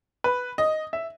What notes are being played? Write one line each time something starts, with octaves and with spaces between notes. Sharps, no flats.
B4
D#5
E5